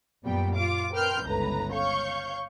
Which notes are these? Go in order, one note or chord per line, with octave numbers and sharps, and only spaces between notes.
F#2 A#2 G3 B3 G5
F4 F5 D6
A#4 B4 G5 C6 F6 G6
G1 C#2 A2 B4 A#5
C#5 F5 C#6 G6